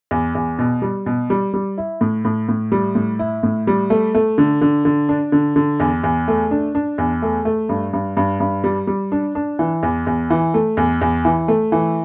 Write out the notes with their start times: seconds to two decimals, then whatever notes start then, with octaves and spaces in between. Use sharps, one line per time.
0.11 E2
0.35 E2
0.59 B2
0.82 G3
1.06 B2
1.30 G3
1.54 G3
1.78 E4
2.01 A2
2.25 A2
2.49 A2
2.72 G3
2.95 A2
3.19 E4
3.43 A2
3.67 G3
3.90 A3
4.15 A3
4.38 D3
4.61 D3
4.85 D3
5.09 D4
5.32 D3
5.56 D3
5.80 E2
6.04 E2
6.28 A3
6.51 D4
6.75 D4
6.98 E2
7.22 A3
7.45 A3
7.69 G2
7.93 G2
8.17 G2
8.40 G2
8.64 G3
8.87 G3
9.12 D4
9.35 D4
9.59 E3
9.83 E2
10.07 E2
10.30 E3
10.54 A3
10.77 E2
11.01 E2
11.25 E3
11.48 A3
11.72 E3